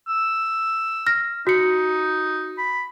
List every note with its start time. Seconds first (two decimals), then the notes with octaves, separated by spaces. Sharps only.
0.08 E6
1.07 F6 A#6
1.47 D#4 F#4 C#7
2.58 B5